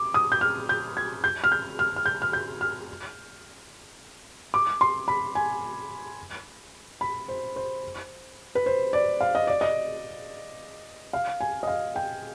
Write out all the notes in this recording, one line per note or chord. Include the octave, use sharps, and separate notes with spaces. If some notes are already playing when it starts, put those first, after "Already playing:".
Already playing: D6
D#6
G6
F6
G6
G#6
G6
F6
G6
F6
F6
G6
F6
G6
F6
D6
C6
B5
G#5
B5
C5
C5
B4
C5
D5
F5
D#5
D5
D#5
F5
G#5
D#5
F5
G5